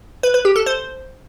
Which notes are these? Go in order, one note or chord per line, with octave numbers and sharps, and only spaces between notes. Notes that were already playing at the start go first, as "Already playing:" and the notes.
B4
B4
G4
A4
C5